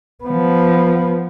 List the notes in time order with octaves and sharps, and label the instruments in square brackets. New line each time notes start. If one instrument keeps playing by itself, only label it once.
[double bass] F3 B3